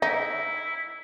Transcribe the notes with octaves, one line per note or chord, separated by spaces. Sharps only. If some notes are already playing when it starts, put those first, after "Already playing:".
D#4 E4 E5